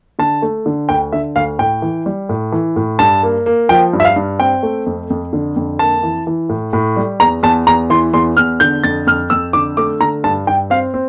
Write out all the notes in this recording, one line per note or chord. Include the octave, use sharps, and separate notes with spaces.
D3 A5
A3
D3
D2 G5
D3 E5
D2 F5
A2 G5
E3
G3
A2
E3
A2
G2 A5
A#3
A#3
F3 G5
G2
E5
F5
G2
C4 G5
A3
F2
F2
D3
F2
A#3 A5
E3
E3
A2
A2
G3
E2 A#5
E2 A5
E2 A#5
E3 C6
E2 C6
E2 F6
D3 G6
F2 A6
F2 F6
F2 E6
D3 D6
A3 D6
D3 A#5
G2 A5
G2 G5
C4 F5
C4